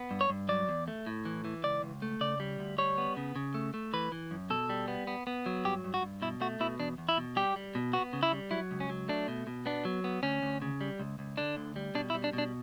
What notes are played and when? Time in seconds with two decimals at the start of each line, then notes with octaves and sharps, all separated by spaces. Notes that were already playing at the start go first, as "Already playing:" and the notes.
Already playing: B3
0.11 G2
0.21 C#5
0.30 G2
0.49 F#3 D5
0.69 E2
0.88 A3
1.07 A2
1.25 E3
1.45 E3
1.64 C#2 D5
1.83 C#2
2.02 A3
2.21 C#3 D5
2.40 G3
2.59 D2
2.78 G3 C#5
2.98 B3
3.17 C#3
3.36 C#3
3.54 A3
3.74 A3
3.93 E3 B4
4.12 E3
4.31 F#2
4.50 B2 A4
4.70 G3
4.88 B3
5.07 B3
5.27 B3
5.46 F#3
5.65 G2 G4
5.84 G2
5.94 F#4
6.02 G2
6.22 B2 E4
6.41 A3 F#4
6.60 B2 E4
6.79 E2 D4
6.98 E2
7.09 E4
7.17 B2
7.36 G3 G4
7.56 G3
7.75 B2
7.93 B3 F#4
8.13 C#3
8.23 E4
8.32 G3
8.51 F#3 E4
8.71 C#2
8.80 C#4
8.90 F#3
9.08 A3 D4
9.28 B2
9.47 B2
9.66 B3 D4
9.85 F#3
10.04 B3
10.23 D2 C#4
10.42 D2
10.62 C#3
10.81 G3
10.99 C#2
11.19 C#2
11.37 D3 D4
11.57 D2
11.76 G3
11.95 B2 D4
12.10 E4
12.14 G3
12.24 D4
12.33 B2
12.38 D4